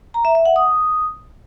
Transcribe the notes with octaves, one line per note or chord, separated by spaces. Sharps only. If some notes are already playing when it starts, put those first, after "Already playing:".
A#5
E5
E5
F#5
D#6